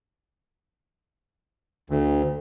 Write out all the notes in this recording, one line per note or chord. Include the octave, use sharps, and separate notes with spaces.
D2